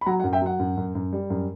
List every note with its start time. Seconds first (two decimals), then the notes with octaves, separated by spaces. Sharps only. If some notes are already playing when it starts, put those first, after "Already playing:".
0.01 B5
0.06 F#3 F#5 A#5
0.20 F#5
0.24 F#2
0.33 E5 G5
0.42 F#3 F#5
0.59 F#2
0.77 F#2
0.95 F#2
1.13 G3
1.30 F#2